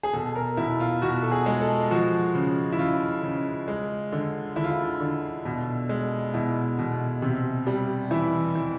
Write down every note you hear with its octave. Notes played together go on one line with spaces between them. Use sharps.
G#4
B2 A4
A#4
B2 E4
F4
B2 F#4
A4
G#4
G#3
A4
F3 F#4
C#3
E4
C#3 F4
C#3
G#3
D3
D3 E4
F4
E4
D3
B2
G#3
B2 E4
B2
C3
G3
E3 E4
E3